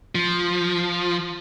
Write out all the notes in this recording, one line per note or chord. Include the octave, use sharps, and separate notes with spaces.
F3